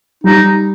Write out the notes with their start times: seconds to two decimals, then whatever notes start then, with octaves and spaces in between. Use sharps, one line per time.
0.24 G3 D#4